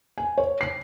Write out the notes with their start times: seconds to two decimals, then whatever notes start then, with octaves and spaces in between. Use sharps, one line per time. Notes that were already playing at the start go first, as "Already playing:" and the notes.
0.18 G#5
0.38 C#5
0.61 C7